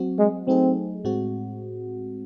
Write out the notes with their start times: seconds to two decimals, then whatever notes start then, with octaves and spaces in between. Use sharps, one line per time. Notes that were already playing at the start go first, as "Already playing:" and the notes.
Already playing: F#3 C4 F#4
0.19 G#3
0.48 F#3 A3 C4 D#4 G#4
1.04 A2 G#3 C4 F#4